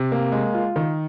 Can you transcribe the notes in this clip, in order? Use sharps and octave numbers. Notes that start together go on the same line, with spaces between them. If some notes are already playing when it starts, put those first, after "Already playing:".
Already playing: C3
A#3
G#3
F4
D#3